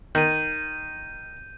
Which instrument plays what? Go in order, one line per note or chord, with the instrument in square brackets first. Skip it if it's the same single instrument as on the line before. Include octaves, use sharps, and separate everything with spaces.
[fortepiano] D#3 [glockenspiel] G6 D#7